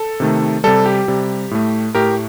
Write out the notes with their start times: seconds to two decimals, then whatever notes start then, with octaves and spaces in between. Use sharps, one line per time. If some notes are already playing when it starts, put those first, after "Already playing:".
Already playing: A4
0.20 C3 D#3 A3
0.64 C3 G3 A4
0.86 G4
1.08 C3 G3
1.51 A2 A3
1.95 A2 A3 G4 A#4